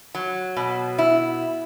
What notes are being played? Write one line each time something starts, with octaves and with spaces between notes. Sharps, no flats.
F#3
B2
E4